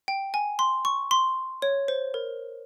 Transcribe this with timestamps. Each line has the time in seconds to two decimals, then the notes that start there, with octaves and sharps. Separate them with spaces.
0.08 G5
0.34 G#5
0.59 C6
0.85 C#6
1.11 C6
1.62 C#5
1.88 C5
2.14 A#4